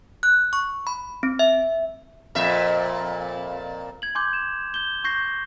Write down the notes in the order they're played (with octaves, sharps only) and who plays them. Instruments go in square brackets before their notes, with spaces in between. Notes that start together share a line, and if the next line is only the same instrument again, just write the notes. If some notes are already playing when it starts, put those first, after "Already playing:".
[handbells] F#6
C#6
B5
C4
E5
[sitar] F2 A#2 E5
[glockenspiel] G#6 F#7
G#5 C6 D6 G6
E7
G6 G7
C#6 G6 A#6 C7